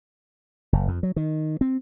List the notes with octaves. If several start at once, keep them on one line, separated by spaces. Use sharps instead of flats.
F#1
F2
F#3
D#3
C4